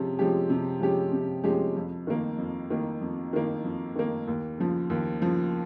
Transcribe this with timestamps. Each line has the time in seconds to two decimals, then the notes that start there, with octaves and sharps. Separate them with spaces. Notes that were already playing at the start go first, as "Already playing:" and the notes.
Already playing: C3 F3 G#3 C#4 G4
0.19 F3 G#3 C#4 G4
0.49 C3
0.80 F3 G#3 C#4 G4
1.12 C3
1.44 F3 G#3 C#4 G4
1.76 F2
2.07 D#3 A#3
2.38 F2
2.70 D#3 A#3
3.01 F2
3.33 D#3 A#3
3.64 F2
3.95 D#3 A#3
4.27 D#2
4.58 C#3 F3
4.90 D#2
5.22 C#3 F3